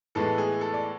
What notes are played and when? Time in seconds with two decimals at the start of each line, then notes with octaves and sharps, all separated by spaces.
0.15 A2 E3 G#3 B3 A4
0.38 G#4
0.61 A4
0.74 D5